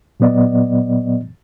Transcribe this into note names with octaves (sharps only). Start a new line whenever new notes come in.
A#2 F#3 B3 D5 D#5